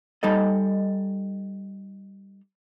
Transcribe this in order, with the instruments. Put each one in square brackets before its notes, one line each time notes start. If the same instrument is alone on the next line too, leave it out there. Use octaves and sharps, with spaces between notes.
[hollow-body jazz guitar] G3 D#4 A4 D#5